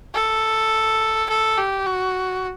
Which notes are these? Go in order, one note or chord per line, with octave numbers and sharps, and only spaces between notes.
A4
A4
G4
F#4